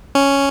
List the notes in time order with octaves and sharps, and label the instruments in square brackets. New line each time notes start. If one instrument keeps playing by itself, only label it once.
[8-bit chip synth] C#4